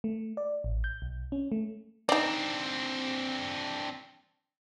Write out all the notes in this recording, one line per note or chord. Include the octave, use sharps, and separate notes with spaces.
A3
D5
A1
G6
B1
C#4
A3
C4 D4 D#4 D5